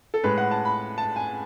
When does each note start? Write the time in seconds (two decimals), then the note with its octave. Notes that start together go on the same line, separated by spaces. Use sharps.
0.14 A4
0.24 A2 G#3 B4
0.38 F#5
0.51 A5
0.65 B5
0.98 A5
1.16 G#5